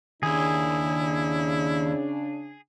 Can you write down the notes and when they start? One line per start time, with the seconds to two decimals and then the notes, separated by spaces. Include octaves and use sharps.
0.23 D#2 C#3 D4 E4 G#4